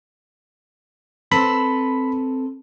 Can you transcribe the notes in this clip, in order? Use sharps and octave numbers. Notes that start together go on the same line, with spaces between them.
C4 A4 B4 B5